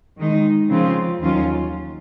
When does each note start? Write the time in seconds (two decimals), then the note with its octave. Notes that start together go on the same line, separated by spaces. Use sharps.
0.17 D#3 G#3 D#4
0.69 C#3 F3 C4 F4
1.21 D#2 D#3 F#3 C#4 F4